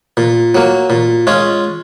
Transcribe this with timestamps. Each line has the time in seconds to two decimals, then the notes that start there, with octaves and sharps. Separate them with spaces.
0.17 A#2
0.55 F#3 A#3
0.90 A#2
1.27 G#3 C#4 F4